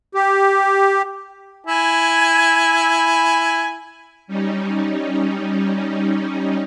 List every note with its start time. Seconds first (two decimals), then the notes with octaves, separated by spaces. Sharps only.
0.15 G4
1.67 E4 G#5
4.27 G3 C#4 D#4